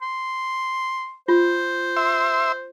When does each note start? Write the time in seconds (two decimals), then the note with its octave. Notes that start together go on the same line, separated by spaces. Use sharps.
0.02 C6
1.28 F4 C5
1.97 E5 C6